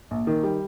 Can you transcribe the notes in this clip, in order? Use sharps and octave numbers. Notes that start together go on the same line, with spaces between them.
A#1
D#3
G3